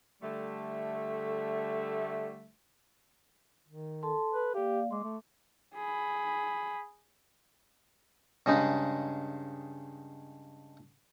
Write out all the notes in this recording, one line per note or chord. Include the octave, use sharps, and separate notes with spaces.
D3 G3 A3
D#3
A4 A5 C6
B4
A#3 G4 D5 F5
G#3 C6 D6
A3
G#4 B5
G2 C#3 G#3 D#4